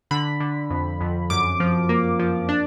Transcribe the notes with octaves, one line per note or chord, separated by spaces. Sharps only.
D3 B5
D3
F2
F2
F#2 D6
F3
A#3
F3
D4